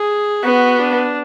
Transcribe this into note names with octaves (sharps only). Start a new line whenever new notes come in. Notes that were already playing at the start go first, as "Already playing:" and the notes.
Already playing: G#4
B3 F#4
D4